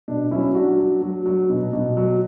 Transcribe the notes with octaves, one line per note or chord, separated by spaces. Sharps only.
B2 D4
F#3 C#4 E4
F#3 D4 F#4
F#3
F#3
F#3
B2
B2
F#3